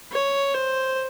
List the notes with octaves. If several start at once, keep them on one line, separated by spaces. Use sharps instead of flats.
C#5
C5